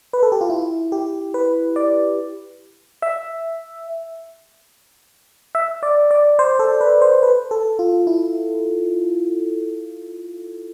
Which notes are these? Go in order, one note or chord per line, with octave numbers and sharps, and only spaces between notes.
B4
A4
G4
F4
E4
G4
B4
D5
E5
E5
D5
D5
C5
A4
B4
C5
B4
A4
F4
E4